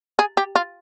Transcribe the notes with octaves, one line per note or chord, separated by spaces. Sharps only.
G#4
G4
F4